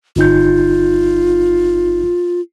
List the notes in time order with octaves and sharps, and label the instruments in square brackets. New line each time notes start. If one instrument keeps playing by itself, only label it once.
[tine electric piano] G1 D#4 G6 [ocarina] F4